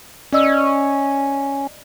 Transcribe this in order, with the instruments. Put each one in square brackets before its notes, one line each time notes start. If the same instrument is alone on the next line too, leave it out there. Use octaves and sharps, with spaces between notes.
[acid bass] C#4 [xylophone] D5 D#5 E6